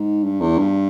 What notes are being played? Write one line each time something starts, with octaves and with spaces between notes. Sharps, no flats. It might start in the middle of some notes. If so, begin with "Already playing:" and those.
Already playing: G#2
G2
E2
G2